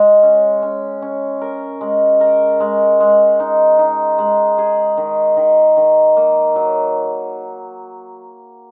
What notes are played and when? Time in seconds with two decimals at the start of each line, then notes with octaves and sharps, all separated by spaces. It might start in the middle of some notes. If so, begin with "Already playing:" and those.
Already playing: G#3
0.23 C#4
0.63 C#4
1.02 C#4
1.41 A#4
1.81 G#3
2.21 A#4
2.60 G#3
3.00 G#3
3.40 D#4
3.79 D#4
4.18 G#3
4.58 G#4
4.97 D#3
5.37 D#3
5.77 D#3
6.17 A#3
6.56 F#3